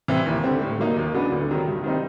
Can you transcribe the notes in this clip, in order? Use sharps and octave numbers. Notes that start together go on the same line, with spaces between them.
C3 E3 G3 C4
D#2
D3 G3 C4
A2
F#3 A#3 D#4
D#2
C#3 F#3 B3 D4
D2
C3 D#3 F#3
G2
D#3 G3 C4 D#4